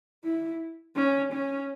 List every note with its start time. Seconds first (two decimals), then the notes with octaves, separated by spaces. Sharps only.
0.24 E4
0.96 C#4
1.33 C#4